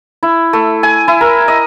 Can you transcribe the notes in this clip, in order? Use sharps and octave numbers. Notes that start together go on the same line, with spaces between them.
E4
A3
G#5
E4
A#4
D#5